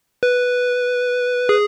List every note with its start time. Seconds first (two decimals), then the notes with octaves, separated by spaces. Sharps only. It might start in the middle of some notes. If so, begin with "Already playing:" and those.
0.23 B4
1.49 G#4